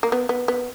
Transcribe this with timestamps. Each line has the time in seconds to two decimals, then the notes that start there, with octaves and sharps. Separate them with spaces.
0.03 A#3
0.12 B3
0.29 B3
0.48 B3